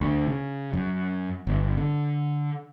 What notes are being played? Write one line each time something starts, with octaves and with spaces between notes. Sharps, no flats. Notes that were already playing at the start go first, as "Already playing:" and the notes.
D2
C#3
F#2
G1
D3